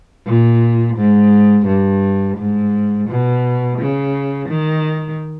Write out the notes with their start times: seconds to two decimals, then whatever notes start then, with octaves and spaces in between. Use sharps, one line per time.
0.26 A#2
0.97 G#2
1.67 G2
2.37 G#2
3.08 B2
3.78 C#3
4.49 D#3